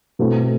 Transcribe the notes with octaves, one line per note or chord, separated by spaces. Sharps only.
B2 A3 C4 E4